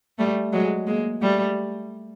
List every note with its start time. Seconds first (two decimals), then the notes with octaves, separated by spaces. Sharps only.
0.18 G3 A3
0.53 F#3 G#3
0.87 G#3 A#3
1.22 G3 A3